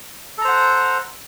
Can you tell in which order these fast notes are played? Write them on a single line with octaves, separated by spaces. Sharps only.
A4 A#5 C5 F#5